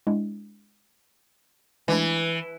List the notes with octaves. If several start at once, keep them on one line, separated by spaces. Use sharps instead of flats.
G#3 D4 E4
E3 G#3 A3 D4